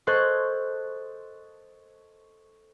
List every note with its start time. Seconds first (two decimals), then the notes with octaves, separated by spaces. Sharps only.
0.07 A4 C5 D#5 C#6 F#6 G#6